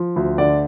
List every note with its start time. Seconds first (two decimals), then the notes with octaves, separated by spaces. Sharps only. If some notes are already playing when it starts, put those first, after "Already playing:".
Already playing: F3
0.16 D2
0.38 D3 D5